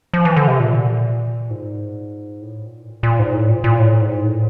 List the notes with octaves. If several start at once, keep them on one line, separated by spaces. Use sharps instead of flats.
F3
E3
D3
C3
A#2
G#2
A2
A#2
A#2
G#2
A2
A#2
A#2
A2
G#2
A2